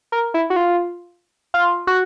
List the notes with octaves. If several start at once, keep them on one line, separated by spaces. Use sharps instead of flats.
A#4
E4
F#4
F4
F4
F#4